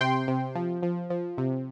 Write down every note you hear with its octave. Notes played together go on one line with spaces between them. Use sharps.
C3 G5 C6
C3
F3
F3
F3
C3